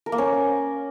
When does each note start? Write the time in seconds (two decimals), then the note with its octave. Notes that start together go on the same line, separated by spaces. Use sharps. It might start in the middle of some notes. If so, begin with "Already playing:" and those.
0.06 A#4
0.12 A#3
0.18 C#4